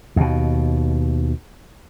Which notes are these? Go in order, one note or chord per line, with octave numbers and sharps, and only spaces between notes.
D#2 B2